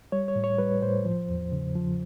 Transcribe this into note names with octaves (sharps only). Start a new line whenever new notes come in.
G3 C#5
C#5
A2
C#5
G3 B4
A2 C5
F3
E2
C#3
F3